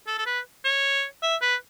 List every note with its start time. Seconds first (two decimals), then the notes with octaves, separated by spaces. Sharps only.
0.07 A4
0.18 A4
0.26 B4
0.65 C#5
1.23 E5
1.42 B4